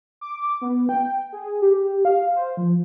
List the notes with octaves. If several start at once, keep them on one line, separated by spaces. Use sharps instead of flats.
D6
B3
G5
G#4
G4
F5
C5
F3